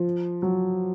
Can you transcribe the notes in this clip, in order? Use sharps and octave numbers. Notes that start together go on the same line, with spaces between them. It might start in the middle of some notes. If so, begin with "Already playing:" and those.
Already playing: F3
F#3